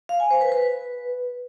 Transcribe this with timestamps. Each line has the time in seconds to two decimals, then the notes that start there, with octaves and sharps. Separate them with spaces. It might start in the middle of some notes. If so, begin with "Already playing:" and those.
0.09 F5
0.20 G#5
0.31 C5
0.41 B4
0.52 B4